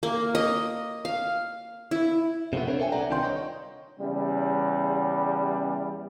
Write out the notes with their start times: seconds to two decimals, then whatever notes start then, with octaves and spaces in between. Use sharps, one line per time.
0.03 A#3
0.35 D#5
1.05 F5
1.91 E4
2.53 C3 F3 G#3 A3 B3
2.67 D4 A#4 C5 C#5
2.80 A4 E5 G5 G#5
2.92 C2 C4 B4 D5 F#5 A#5
3.10 C2 D#3 D4 F4 G5 C6
3.23 C#5 D#5
3.99 E2 C#3 G3